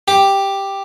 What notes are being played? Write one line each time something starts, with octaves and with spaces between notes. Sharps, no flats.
G4